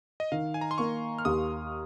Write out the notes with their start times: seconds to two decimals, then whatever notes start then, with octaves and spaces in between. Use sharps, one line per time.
0.20 D#5
0.32 D#3 F5
0.54 G#5
0.61 A#5
0.71 C6
0.78 A#3 C#6
1.19 F6
1.25 D#2 D#6